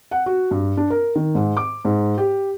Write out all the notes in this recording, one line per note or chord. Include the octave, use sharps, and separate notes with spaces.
F#5
F#4
G2
D4
A#4
D#3
G#2
D6
G#2
G4